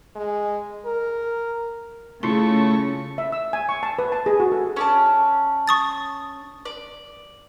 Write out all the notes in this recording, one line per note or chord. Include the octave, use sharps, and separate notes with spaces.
G#3
A#4
C#3 A3 E4 F4 C6 C#6
E5
E6
G#5
C#6
A5
B4
A5
G#4
F#4
A4
C#4 D5 A5
C#6 D#6 A6
D5